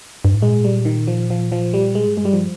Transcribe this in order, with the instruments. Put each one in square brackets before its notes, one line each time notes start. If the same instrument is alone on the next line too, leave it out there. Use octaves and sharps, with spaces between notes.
[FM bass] G2
G#2
[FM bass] A#2 [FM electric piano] G#3
[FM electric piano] G3
D#3
F3
F3
F3
G3
G#3
[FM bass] G#2
[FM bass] G2 [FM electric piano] G#3
[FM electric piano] G3
F3